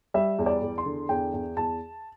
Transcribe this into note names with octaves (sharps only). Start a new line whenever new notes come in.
G3 E5
E2
D5
E2
C6
D3
E2 G5
E2
E2 A5